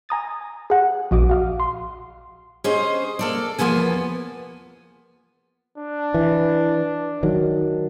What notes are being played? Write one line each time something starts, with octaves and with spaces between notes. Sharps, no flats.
G#5 A#5 D#6 A6
G#4 F#5
A#1 F#4 D#5 D6
F#4 F5
C6
C#4 G#4 C5 D#5
A#3 A4 D5
E2 F3 A#3 B3 G#5
D4
E3
D#3 F#3